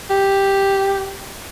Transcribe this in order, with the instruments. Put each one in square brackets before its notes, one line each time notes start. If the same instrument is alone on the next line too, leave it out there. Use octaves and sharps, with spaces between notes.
[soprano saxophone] G4